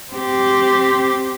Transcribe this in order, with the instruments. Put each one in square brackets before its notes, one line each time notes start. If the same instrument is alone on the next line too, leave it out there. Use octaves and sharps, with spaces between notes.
[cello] C4 G4